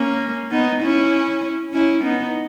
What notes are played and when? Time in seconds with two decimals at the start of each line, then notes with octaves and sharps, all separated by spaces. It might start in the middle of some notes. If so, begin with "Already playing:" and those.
Already playing: A#3 C#4
0.51 B3 D#4
0.81 C#4 E4
1.73 C#4 E4
2.04 B3 D#4